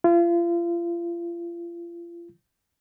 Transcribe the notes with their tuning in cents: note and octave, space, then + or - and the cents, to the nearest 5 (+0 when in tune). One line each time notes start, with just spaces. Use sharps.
F4 -35